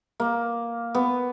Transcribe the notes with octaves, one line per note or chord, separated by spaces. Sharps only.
A#3
B3